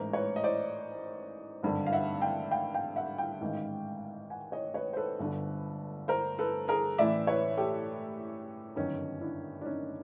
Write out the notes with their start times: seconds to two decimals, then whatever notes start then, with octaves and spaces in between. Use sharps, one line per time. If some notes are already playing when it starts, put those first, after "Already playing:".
Already playing: A1 G#2 E3 A#4 C5
0.13 B4 C#5
0.36 D#5
0.44 C5 D5
1.63 G#1 G2 D3
1.87 F5
1.93 E5 F#5
2.22 F5 G5
2.51 F5 G5
2.74 F5 G5
2.96 E5 F#5
3.18 F5 G5
3.41 A1 G#2 D#3
4.30 F#5 G#5
4.52 C#5 D#5
4.74 B4 C#5
4.93 C5
4.97 A4 B4
5.19 G1 G2 D3
6.08 A#4 C5
6.39 A4 B4
6.68 G#4 A#4
6.98 A1 A2 E3 D5 E5
7.27 B4 C#5
7.57 G4 A4
8.76 G1 F#2 D#3 C#4 D#4
9.21 D4 E4
9.61 D4
9.66 C#4 D#4